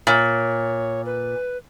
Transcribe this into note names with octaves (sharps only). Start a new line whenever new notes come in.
A#2 C#5
B4